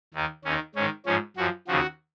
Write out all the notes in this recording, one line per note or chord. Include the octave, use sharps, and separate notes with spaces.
D#2 D#3
D#2 D#3 C#4
G#2 D#3 C#4
G#2 F3 C#4
F#2 F3 F#4
D#2 C#3 F3 F#4